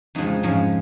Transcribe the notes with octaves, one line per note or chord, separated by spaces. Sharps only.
F2 C#3 F3 G#3 D#4
G#2 F3 G#3 C#4